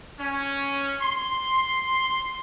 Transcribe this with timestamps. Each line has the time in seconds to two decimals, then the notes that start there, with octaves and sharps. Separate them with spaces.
0.19 C#4
1.01 C6